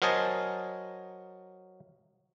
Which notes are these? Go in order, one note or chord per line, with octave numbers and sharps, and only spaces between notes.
F#3 A#4 C5 D#5 G#5 A5